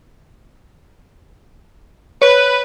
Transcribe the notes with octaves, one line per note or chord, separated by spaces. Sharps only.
B4 C#5